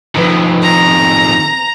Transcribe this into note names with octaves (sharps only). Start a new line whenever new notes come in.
F2 D#3 B4
A#5